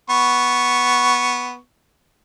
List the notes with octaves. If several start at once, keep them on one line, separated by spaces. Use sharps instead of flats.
B3 C#6